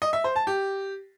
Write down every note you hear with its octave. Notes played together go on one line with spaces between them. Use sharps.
D#5
E5
C5
A5
G4